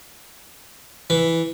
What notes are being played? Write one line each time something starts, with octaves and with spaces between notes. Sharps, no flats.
E3